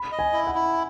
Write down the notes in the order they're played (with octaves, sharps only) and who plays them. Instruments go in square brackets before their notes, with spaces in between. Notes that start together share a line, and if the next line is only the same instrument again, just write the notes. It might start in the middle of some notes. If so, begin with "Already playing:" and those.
Already playing: [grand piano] B5
[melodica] D#5
[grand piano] G#5
[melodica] E4
[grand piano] F#5
[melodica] E4